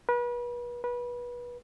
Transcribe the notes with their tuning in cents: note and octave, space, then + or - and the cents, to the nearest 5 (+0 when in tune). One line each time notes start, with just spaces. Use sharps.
B4 -35
B4 -25